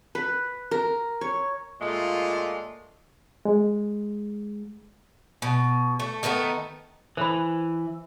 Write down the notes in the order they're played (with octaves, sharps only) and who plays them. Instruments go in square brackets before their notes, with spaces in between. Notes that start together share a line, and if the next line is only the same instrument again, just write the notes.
[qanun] B4
A#4
C#5
[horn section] A#2 G#3 A3 F4
[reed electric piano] G#3
[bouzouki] B2
A3
D#3 A3 B3 D#4
[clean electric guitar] E3 [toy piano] C5 B5